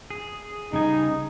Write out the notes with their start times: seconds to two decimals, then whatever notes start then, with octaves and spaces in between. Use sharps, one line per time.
0.10 G#4
0.73 C#3 G3 D#4 G#5